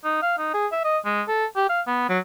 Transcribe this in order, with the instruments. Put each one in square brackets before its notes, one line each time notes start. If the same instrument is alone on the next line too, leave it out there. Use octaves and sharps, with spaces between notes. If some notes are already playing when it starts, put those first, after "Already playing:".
[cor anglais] D#4
F5
D#4
G#4
E5
D#5
G#3
A4
G4
F5
B3
F#3